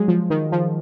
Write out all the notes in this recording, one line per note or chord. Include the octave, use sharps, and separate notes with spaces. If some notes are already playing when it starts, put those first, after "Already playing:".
Already playing: F#3 G#3
F3
D#3
F3